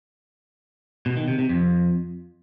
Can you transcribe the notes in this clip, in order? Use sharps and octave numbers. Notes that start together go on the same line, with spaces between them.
B2
D#3
C3
C3
F2